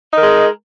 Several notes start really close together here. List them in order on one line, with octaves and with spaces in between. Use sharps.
D#4 A#4 G#3